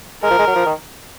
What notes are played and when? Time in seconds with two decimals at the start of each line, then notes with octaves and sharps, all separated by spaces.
0.23 G#3 A#4
0.30 F3
0.39 G#3
0.47 F#3
0.56 F3
0.66 D#3